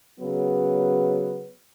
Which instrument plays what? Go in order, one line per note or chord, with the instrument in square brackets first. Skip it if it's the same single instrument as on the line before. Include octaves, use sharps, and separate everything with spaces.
[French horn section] C#3 F#3 B3